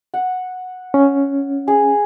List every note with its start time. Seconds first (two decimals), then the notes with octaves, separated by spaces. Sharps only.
0.14 F#5
0.94 C#4
1.68 G#4